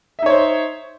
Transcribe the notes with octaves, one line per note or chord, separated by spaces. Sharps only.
D#4 C5 C#5 E5